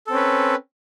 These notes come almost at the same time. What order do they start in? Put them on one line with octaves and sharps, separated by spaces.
A4 C4 C#4 B4